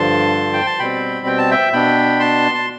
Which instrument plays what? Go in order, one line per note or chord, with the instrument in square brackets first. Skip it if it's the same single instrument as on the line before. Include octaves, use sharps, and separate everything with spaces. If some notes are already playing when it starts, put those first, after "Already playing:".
Already playing: [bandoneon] G2 D3 F3 A5 C6
G5
A5
B2 G3 C4 G5 B5
G5
A5
E5 G5
B2 B3 D4 G5 B5
A5 C6
A5